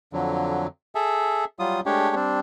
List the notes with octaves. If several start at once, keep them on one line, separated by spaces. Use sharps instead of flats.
F2 D3 F#3
G#4 A4 E5
F#3 G3 F4 D#6
G#3 A3 D4 G4 C#5
G3 C4 D4